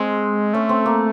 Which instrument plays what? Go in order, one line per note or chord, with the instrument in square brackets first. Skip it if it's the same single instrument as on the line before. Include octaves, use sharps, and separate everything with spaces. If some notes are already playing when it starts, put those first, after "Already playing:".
Already playing: [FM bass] G#3 [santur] C4
[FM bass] A3 [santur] C#4
[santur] C4
A#3